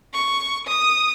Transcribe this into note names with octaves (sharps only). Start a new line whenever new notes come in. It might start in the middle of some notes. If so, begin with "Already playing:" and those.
C#6
D#6